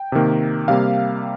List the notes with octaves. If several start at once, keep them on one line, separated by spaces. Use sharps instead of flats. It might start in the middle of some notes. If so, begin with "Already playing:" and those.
Already playing: G5
C3 D#3 A#3
C3 G3 A#3 F5